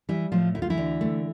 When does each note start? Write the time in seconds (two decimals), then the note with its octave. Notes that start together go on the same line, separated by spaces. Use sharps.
0.09 E3 G3 E4
0.32 A2 F3 F4
0.55 D2 E4
0.62 F4
0.70 E3 E4
0.78 D3
1.01 A3